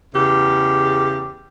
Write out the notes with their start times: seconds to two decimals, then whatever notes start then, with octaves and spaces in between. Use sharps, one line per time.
0.14 E2 C#3 G4